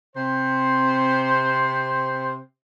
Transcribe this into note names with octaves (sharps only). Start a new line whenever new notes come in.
C3 C5